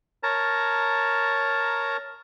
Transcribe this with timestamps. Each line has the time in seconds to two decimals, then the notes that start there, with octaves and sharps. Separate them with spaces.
0.23 A#4 C#5 A5 A#5